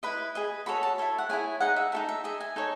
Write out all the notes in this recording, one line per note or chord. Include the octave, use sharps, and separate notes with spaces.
E4 B4 D#5 B5
G#4 B4 D#5
F#4 A4 C#5 B5
A5
E4 A4 C#5
F#5
E4 G#4 C#5 G#5
D#4 G#4 D#5 F#5
E5
D#4 F#4 A4 E5
E5
G#4 D#5 E5
G#5
D#4 A4 C#5